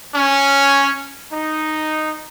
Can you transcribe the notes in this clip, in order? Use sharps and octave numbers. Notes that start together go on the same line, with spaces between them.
C#4
D#4